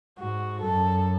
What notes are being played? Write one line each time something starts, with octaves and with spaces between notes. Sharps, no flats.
G#2 F#4
F#2 A4